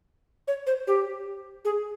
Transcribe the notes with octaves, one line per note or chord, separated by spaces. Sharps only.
C#5
C5
G4
G#4